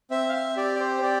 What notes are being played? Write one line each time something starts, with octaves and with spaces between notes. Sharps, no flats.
C4 E5
F5
E5
G4 D5
D5
C5
C4 D5